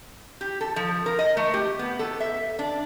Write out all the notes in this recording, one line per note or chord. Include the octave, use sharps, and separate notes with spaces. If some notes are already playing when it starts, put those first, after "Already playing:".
G4
A4
F3
A#4
D#5
A3
G4
B3
A4
E5
D4